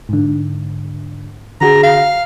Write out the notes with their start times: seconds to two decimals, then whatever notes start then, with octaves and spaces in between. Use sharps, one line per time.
0.09 G#2 D3
1.61 D3 F#4 G#4 A#5
1.83 F5